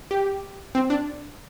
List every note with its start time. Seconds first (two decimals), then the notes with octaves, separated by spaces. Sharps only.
0.11 G4
0.75 C4
0.90 D4